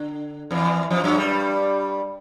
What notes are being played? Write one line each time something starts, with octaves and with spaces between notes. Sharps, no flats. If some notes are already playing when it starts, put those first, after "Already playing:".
Already playing: D3
E2 E3
F2 F3
F#2 F#3
G2 G3